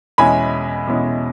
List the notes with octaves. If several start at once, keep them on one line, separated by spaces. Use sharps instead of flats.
E2 B2 G#3 C#4 E4 G#5 B5
E2 B2 G#3 C#4 E4